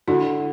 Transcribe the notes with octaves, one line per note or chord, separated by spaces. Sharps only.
D3 E4 F#4